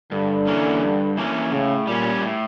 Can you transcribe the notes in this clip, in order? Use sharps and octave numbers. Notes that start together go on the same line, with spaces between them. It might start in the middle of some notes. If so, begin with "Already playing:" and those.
G2 D3
E3 A#3 C#4
G2
E3 A#3 C#4
A2 C#3
A#2 G3 C#4
A2